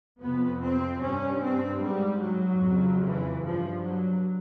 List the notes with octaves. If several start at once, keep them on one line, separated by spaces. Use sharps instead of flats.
F2 C3 B3
C4
G2 C#4
C4
G#2 G3
F#3
F2 C#3
E3
G2 F3
F#3